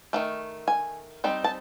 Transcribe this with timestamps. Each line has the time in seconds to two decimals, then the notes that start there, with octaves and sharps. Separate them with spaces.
0.13 D#3 F#3 A3
0.68 G#5
1.24 G3 C4 D#4
1.44 A5